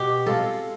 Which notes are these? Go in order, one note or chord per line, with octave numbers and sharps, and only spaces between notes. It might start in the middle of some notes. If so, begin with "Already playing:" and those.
Already playing: B2 G4
G#3 C4 F4 A4